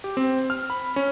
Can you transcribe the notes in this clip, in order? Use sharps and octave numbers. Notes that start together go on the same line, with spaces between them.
G4
C4
F6
B5
C#4